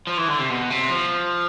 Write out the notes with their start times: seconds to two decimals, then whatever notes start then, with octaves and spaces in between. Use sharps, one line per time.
0.07 F3
0.17 E3
0.28 D3
0.40 C3
0.49 B2
0.70 C3
0.90 F3